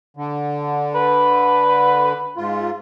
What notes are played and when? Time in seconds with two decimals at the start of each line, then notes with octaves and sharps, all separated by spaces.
0.17 D3
0.95 B4
2.37 G#2 F4